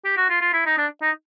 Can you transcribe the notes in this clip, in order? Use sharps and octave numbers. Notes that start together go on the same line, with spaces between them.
G4
F#4
F4
F4
E4
D#4
D4
D#4